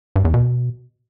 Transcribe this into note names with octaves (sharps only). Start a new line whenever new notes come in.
G2
E2
B2